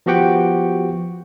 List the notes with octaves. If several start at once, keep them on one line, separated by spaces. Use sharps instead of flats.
F3 B3 F#4 G4 F#5 G5